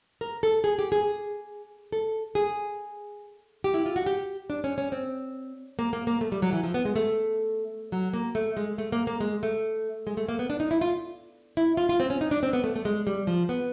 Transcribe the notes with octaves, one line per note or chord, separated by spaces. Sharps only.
A#4
A4
G#4
G4
G#4
A4
G#4
G4
E4
F4
F#4
G4
D4
C#4
C#4
C4
A#3
A#3
A#3
A3
G3
F#3
E3
F3
B3
G#3
A3
F#3
A#3
A3
G#3
A3
A#3
A#3
G#3
A3
G#3
A3
A#3
B3
D4
D#4
E4
F4
E4
F4
F4
C4
C#4
D#4
D4
C4
B3
A3
A3
G#3
G3
F3
B3